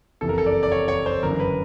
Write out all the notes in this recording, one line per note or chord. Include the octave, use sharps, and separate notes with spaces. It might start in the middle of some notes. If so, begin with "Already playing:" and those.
F#1 F2 C3 E3 A4
A#4
A4
D5
D5
C#5
C#5
C5
G1 F#2 C#3 E3 A#4
B4